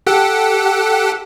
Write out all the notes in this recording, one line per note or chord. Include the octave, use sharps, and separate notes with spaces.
G4 A4 F#5